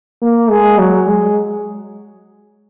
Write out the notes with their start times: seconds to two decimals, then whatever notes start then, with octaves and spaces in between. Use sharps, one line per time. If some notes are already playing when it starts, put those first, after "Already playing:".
0.22 A#3
0.50 G#3
0.79 F#3
1.08 G#3